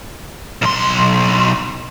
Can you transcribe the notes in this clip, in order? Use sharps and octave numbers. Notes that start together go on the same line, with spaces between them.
B1 C6